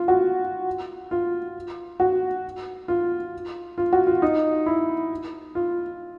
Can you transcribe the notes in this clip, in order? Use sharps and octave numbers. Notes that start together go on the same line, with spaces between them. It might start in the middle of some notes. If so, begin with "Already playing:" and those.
Already playing: F4
F#4
F4
F#4
F4
F4
F#4
F4
D#4
E4
F4